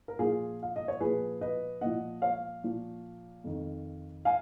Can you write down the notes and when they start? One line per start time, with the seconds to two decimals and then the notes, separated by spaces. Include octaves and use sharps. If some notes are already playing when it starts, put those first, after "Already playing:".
0.08 A#4
0.19 A#2 F3 F4 G#4
0.63 F5
0.76 D#5
0.88 C#5
1.00 A#2 F3 G#4 B4
1.41 B4 D#5
1.81 A#2 F3 D#5 F#5
2.22 C#5 F5
2.64 A#2 F3
3.44 F2 D#3
4.25 F5 G#5